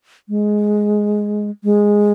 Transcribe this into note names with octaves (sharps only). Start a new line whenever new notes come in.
G#3
G#3